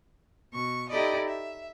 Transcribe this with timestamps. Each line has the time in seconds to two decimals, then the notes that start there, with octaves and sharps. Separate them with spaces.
0.53 B2 C#6
0.90 D#4 E4 G4 A4 D5 D#5
1.28 E5